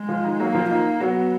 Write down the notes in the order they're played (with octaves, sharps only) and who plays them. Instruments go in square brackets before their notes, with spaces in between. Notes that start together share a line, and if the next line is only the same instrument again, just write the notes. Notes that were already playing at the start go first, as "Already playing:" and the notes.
Already playing: [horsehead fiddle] G#3
[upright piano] F3 F4
D#3 D#4
[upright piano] F#3 F#4 [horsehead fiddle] A#3
[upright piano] F3 F4
[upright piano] D#3 D#4 [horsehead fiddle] A#3
[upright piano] F#3 F#4 [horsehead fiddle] B3